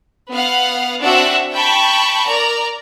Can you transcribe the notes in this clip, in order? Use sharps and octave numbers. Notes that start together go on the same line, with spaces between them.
B3 F5 F#5
C4 D4 F#4 E5 F#5
G5 A5 B5 C#6
A#4 D5 A#5